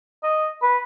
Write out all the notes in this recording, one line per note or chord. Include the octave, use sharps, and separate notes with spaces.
D#5
B4